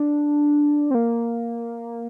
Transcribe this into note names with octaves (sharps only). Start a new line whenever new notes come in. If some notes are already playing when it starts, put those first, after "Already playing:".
Already playing: D4
C4
A#3